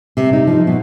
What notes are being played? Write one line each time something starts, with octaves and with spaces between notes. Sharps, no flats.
C3
D#4
F3
B2